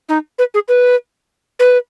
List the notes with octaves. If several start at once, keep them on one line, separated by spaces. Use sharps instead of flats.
D#4
B4
G#4
B4
B4